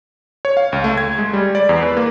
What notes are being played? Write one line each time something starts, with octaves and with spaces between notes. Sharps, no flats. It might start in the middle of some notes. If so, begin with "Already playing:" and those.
C#5
F5
C#2
A3
G#6
G#3
G3
D5
E2
B4
A#3